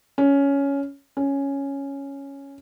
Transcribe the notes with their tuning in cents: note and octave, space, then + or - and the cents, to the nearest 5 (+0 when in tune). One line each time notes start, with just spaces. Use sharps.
C#4 +10
C#4 +0